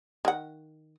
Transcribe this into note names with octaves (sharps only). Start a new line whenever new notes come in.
D#3 F#5